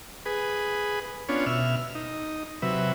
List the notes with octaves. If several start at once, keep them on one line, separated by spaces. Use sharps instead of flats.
G#4 B4
B3 C#4 D4 F4 C#5
B2 E5 F6
D#4
C3 F#3 B4 E5